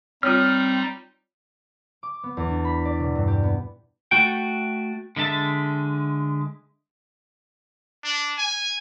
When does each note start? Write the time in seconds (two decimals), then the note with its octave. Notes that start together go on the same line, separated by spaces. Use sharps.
0.23 G3 C4 D#4 F4 C#5 F6
2.03 D6
2.23 B3
2.37 E2
2.49 D4
2.65 B5
2.85 D5
3.00 B2
3.15 G2
3.28 G4
3.43 B3
4.11 A3 F#4 G5
5.16 D3 G#3 E5 A5
8.04 D4
8.38 G#5